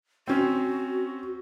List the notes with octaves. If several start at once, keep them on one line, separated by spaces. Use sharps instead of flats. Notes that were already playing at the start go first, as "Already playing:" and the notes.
C4 C#4 F#4